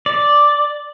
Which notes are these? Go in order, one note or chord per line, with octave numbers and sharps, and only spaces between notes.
D5